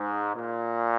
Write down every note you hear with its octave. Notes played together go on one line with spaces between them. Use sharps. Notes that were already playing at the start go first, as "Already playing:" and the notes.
Already playing: G#2
A#2